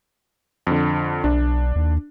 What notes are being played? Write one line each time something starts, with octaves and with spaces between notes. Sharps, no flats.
F2 D3
B1 D4
D#2